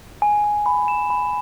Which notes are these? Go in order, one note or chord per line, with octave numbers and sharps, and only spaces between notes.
G#5
G#5
B5
E7
B5